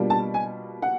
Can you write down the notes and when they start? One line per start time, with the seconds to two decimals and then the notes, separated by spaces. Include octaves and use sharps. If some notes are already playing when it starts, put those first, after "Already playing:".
Already playing: B2 G3 A#3 D4 F4
0.10 A5
0.34 G#5
0.82 F#5